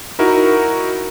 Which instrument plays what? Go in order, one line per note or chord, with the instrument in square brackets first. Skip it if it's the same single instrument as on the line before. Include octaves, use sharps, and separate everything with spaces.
[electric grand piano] D#4 E4 F#4 A#4